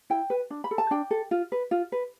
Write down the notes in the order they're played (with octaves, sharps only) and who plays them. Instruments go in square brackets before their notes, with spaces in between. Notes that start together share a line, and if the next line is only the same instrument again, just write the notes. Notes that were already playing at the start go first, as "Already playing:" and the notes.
[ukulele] E4 G5
B4
D4
B5
A4
A5
D4 G5
A4
F4
B4
F4
B4